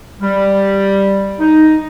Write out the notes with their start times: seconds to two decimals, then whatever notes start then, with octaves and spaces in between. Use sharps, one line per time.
0.20 G3
1.39 D#4